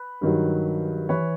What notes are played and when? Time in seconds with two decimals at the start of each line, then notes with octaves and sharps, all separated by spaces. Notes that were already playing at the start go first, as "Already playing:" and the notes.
Already playing: B4
0.21 G2 D#3 F#3
1.09 E3 B4 C#5